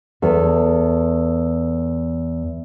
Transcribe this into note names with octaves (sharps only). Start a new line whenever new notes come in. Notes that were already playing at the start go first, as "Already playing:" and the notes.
E2 A4